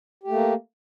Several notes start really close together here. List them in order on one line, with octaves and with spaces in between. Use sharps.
G4 A3 A#3